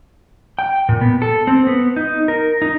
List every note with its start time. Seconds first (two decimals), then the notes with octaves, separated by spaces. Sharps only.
0.59 G5
0.89 A#2
1.01 B3
1.22 A4
1.47 C4
1.67 B3
1.96 D#4
2.28 A#4
2.62 D#4